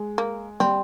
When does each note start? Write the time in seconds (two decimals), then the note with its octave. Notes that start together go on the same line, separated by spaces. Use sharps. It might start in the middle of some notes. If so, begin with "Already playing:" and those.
Already playing: G#3
0.18 A#3
0.60 G3 C4